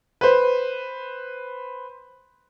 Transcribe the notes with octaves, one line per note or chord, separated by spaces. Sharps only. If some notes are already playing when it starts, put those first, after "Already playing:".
B4 C5